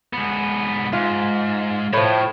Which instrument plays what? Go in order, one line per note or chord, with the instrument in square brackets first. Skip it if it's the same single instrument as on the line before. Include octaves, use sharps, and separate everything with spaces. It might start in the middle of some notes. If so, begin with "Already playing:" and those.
[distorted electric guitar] G#2 B3
[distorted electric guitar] G#2 [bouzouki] F4
[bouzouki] A2 F3 [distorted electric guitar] E4 C#5